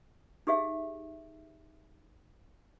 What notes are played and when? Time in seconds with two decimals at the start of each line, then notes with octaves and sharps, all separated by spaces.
0.47 D#4 G4 G#4 E5 F5